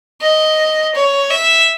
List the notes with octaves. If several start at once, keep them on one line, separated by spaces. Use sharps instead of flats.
D#5
C#5
E5